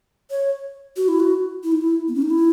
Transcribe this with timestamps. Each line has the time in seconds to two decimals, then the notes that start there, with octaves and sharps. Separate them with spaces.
0.30 C#5
0.97 F#4
1.08 E4
1.20 F#4
1.64 E4
1.72 D#4
1.81 E4
2.08 B3
2.15 C#4
2.22 D#4
2.30 E4